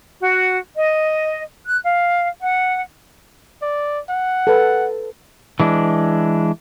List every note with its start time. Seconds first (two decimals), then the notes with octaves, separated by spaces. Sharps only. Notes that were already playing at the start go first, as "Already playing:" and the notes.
0.22 F#4
0.75 D#5
1.66 F#6
1.83 F5
2.41 F#5
3.62 D5
4.09 F#5
4.47 A4 B4
5.60 E3 G#3 D4